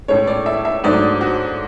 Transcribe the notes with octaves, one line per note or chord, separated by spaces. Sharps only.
A2 G#3 C#4 C#5
D5
E5
E5
G#2 F#3 A3 D4 D5
F#4